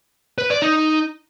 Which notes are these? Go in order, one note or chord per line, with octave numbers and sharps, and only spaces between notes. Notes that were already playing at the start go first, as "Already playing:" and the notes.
B4
D5
D#4